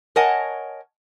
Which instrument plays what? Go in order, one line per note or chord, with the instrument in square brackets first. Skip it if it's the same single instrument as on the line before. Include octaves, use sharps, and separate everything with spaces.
[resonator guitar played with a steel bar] A#4 C#5 D#5 F#5 G#5 A5